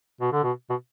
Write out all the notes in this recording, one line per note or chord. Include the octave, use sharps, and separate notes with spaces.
B2
D3
B2
B2